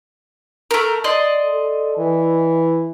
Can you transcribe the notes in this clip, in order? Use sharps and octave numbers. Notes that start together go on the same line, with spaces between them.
A3 A#4
D5 D#5 C6
A4
E3